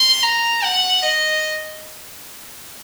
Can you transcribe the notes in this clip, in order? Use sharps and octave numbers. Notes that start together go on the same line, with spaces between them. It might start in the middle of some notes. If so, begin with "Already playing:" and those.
Already playing: C6
A#5
F#5
D#5